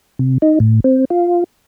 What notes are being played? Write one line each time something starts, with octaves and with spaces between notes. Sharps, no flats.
C3
D#4
A2
C4
F4